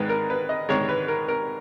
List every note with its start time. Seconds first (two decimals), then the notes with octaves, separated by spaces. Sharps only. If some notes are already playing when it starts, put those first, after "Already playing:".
Already playing: G#2 D#3 G#3 B4
0.09 A#4
0.30 B4
0.49 D#5
0.69 G#2 D#3 G#3 C#5
0.89 B4
1.08 A#4
1.28 A#4